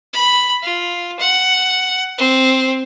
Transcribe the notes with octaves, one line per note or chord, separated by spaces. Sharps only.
B5
F4
F#5
C4